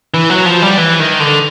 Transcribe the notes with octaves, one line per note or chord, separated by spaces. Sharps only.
E3
F#3
F3
G3
E3
D#3
D3